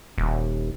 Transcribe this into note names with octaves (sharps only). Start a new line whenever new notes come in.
D#1